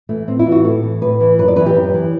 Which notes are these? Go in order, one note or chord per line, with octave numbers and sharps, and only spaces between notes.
E3 A3
A2 C4
E4
E3
F#4
A2 A4
E3
A2 B4
E3
F#2 B4
D5
E3 B4
G4
F#2
E3